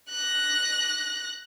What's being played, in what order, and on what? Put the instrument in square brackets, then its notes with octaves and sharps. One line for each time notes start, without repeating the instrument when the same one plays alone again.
[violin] F#6 A#6